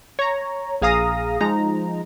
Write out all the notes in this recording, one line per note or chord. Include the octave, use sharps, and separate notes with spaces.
C#5 A#5
A#1 G#4 F5 A#5 D#6 A#6
F3 G#3 D#4 A#5